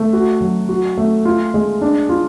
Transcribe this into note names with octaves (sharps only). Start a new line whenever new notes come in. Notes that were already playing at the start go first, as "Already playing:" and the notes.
Already playing: A3
F#4
F#3
F#4
A3
F4
G#3
D4
F4